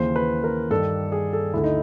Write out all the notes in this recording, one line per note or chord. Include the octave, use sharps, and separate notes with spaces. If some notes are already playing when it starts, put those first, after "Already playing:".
Already playing: D#2 C#3 E3 C5
B4
A#4
G2 D#3 A4
G#4
A4
D2 D3 E4
D#4